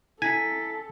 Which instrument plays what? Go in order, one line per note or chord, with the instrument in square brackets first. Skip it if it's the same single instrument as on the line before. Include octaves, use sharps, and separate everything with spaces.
[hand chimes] E4 B6 [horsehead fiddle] A4 [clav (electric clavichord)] G#5